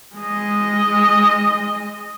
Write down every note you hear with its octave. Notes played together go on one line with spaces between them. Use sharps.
G#3 D#5